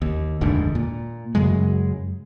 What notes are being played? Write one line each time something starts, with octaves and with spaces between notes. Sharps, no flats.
D#2
F1 D#2 G#2 D3
A#2
F#2 C#3 F#3 G#3